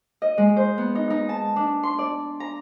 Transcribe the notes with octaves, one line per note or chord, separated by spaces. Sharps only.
D#5
G#3
C5
B3
D#4
D#4
A5
D4
C6
D5
A#5